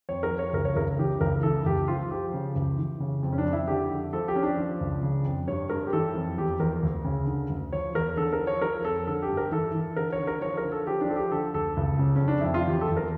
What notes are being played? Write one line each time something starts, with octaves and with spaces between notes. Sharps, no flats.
F2 C#5
A#4
F3
C#5
C#2 A#4
C#5
C#2 A#4
E3 G4
C#2 A#4
E3 A4
C#2 G4
F3 F4
F3 G4
C#3
C#2
E3
C#3
F2
C#4
D4
F2
E4
D3 G4
D3
F3 A4
G4
F3 C#4
D4
F3
C#2
C#3
F2
G2 C#5
G2 A#4
G4
E3 A4
F2
E2 G4
E2 A#4
D2
C#3
D3
D2
F3 C#5
E2 A#4
D3 A4
A#4
F3
C#5
F3 A#4
F2 A4
D3 A4
G4
G2
A#4
E3 A4
E3
D3 A#4
C#5
D3
A#4
F3 C#5
A#4
D3
A4
F3 G4
D4
F3 A4
G4
D3 A4
D2 A4
C#2
C#3
C#4
F2
D4
F2 E4
F4
E2 G4
A4
E2
A#4